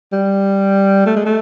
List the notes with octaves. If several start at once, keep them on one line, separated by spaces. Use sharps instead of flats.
G3
A3
G#3
A3